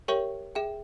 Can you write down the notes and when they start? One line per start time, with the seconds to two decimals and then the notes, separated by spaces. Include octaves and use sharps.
0.08 G4 A#4 C#5 E5 G5 C#6
0.55 G#4 E5 G5